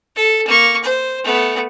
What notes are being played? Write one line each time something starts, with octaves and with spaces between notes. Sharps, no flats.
A4
A#3 C#6
C5
A3 B3